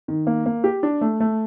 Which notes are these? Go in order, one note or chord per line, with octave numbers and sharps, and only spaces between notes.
D#3
A#3
A#3
G4
D4
A3
A3